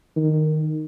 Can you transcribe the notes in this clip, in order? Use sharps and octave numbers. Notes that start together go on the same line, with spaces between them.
D#3